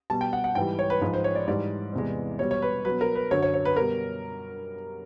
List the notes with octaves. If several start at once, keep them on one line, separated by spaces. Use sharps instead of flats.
B2 G3 A5
G5
F#5
F#5
G#2 E3 G3 G5
C#5
B4
G#2 F3 G#3 B4
C5
C#5
D5
G#2 E3 G3 D5
E2 C3 E3 G#3
B2 G3 C#5
C#5
B4
B2 F#3 B4
A#4
B4
F#2 D3 F#3 C#5
C#5
C#5
B4
B2 G3 A#4